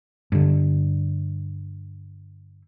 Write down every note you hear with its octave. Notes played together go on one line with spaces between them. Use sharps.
G2 D3